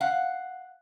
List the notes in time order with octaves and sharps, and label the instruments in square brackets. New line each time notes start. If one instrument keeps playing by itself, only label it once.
[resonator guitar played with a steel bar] F5 F#5